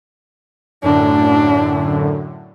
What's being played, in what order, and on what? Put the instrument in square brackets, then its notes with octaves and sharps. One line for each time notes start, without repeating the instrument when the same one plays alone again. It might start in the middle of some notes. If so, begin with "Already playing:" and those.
[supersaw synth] F#2 A2 D3 [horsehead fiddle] D4